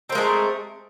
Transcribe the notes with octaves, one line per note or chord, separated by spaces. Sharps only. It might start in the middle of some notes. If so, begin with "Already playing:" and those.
G#3 A3 C4 A#4